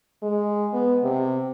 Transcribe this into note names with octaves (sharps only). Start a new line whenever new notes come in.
G#3
B3
C3